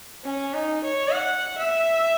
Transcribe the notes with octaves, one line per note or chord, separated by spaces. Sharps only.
C#4
D#4
C#5
F#5
E5